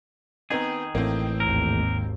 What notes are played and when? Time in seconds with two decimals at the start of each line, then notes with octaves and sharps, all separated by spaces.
0.50 D#3 B3 C4 D#4 G#4
0.95 A1 A2 A#3 C4
1.40 G#1 D#2 A#4